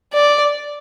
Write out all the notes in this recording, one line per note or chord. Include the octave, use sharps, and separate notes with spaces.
D5